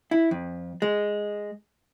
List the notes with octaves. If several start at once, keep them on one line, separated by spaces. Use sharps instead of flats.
E4
F2
G#3